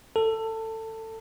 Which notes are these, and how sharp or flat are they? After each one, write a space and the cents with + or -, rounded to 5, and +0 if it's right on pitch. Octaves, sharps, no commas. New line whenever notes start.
A4 +20